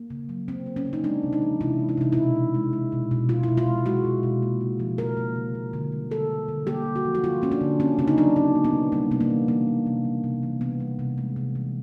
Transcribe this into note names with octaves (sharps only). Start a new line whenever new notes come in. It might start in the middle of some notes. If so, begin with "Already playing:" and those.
Already playing: A#3
C#3
F#3
C#3 C4
A#3
C#4
C#3
D#4
G#3 D4
C3
D#4
E3
C3 E4
G#3
E4
C3 D#4
B2 E4
B2
G#3
G#3
B2
B2
B2 F4
B2 E4
F4
G#3
G#3 F#4
B2
B2
A#3
C#3
F3
C#3 A#4
A#3
C#3
A#3
D3
G3
D3 A4
A#3
D3
A#3 G4
D3
F#4
F3
F#4
D3 F4
A#3 C#4
D4
D3
A#3 C#4
C#3 C#4
D#4
F#3 D4
C#3 C#4
A#3
B3
C#3
G3 A#3
C3 B3
A#3
E3
A#3
G3
C3
G3
C3
E3
C3 B3
G3
C3
G#3
C3
E3